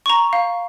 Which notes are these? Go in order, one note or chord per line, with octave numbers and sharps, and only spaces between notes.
C#6
A#5
F5